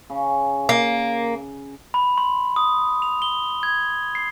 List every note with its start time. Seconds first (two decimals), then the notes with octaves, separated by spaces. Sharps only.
0.10 C#3
0.69 A#3
1.94 B5
2.18 C6
2.56 D#6
3.02 F7
3.22 G7
3.63 G#6
4.15 C7